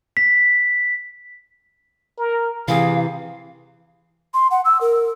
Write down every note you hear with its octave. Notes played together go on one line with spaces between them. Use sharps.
B6
A#4
C3 E3 G#4 F5
C6
F#5
E6
A#4